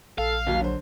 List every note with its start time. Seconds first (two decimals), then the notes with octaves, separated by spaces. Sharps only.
0.18 A#1 A4 F5
0.47 D#2 F#3 A#3
0.60 D3 F#3 C5